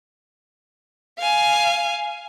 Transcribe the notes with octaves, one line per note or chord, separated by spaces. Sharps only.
F5 G#5